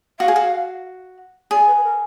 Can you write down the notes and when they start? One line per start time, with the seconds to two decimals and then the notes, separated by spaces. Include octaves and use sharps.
0.20 F#4 F5
0.28 G#4
0.36 F#4
1.51 G#4 D5
1.67 B4
1.78 B4
1.84 A#4